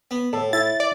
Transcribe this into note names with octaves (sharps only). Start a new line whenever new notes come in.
B3
A2 A4
E4 A6
D5